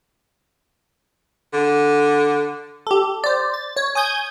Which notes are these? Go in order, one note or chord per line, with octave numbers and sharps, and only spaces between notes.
D3
G4 A4
C5 D5
A6
C#5
G#5 D#6 G6 G#6